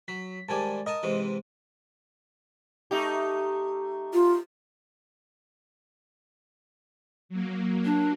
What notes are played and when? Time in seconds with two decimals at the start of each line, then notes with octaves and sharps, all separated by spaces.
0.08 F#3 B6
0.49 G#2 D#3 G3 D5 G#5 A5
0.86 A#4 D#5 G#5 A5
1.03 G#2 C3 E3
2.91 A3 D#4 G4
4.13 F4
7.29 F#3 A#3
7.84 D4